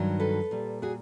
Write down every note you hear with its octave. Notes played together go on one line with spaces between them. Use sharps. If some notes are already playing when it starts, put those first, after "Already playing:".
Already playing: G2 D#3 F#3
A4 B4
A#2 G3
F#4 G#4